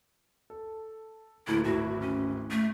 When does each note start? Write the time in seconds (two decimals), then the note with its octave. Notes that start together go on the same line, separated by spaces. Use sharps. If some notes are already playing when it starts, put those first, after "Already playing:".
0.50 A4
1.47 D1 D3 A#3 E4
1.64 D1 G#1 E4 F#4
2.01 C#4
2.51 A3